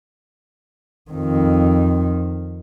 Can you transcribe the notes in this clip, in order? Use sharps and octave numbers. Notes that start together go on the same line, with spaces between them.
F2 D#3